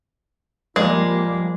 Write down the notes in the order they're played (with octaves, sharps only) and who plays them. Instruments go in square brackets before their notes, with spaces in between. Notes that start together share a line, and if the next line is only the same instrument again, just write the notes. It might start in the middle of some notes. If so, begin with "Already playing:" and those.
[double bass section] F3 G3 A#3 [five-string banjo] G#3